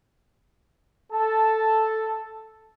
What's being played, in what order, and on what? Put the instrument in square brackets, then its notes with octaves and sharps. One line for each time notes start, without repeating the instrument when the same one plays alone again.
[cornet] A4 [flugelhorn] A5